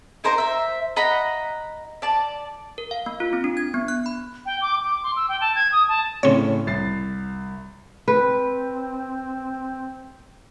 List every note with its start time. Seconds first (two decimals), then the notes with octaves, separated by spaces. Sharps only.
0.24 D#4 A#4 C5 A#5
0.38 C5 E5
0.96 D#5 F#5 A#5 B5
2.02 D5 A5
2.78 A#4
2.91 F5
3.06 A#3
3.20 F4
3.33 C4
3.44 D4
3.57 G#6
3.74 B3
3.88 F#6
4.06 B5
4.46 G5
4.62 D6
4.83 D6
5.03 C6
5.16 E6
5.29 G5
5.41 A5
5.55 G#6
5.72 D#6
5.89 A5
6.23 A2 C#3 C4 C#4 C#5
6.67 C2 A6 C7
8.08 C4 B4